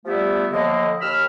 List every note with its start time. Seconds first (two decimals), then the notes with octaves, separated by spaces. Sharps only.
0.05 F3 G3 A3 B3 E4 G4
0.52 A2 D3 F3 A#3 D#5
1.01 D#2 B5 E6 F6